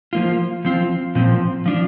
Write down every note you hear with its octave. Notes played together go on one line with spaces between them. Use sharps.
F3 A#3 F4
F3 C4 F4
A#2 F3 C4
F3 D4 F4